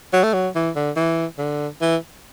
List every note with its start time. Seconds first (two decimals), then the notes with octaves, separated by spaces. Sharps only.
0.13 F#3
0.23 A3
0.34 F#3
0.55 E3
0.76 D3
0.96 E3
1.38 D3
1.81 E3